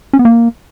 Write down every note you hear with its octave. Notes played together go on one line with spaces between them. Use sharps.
C#4
B3
A#3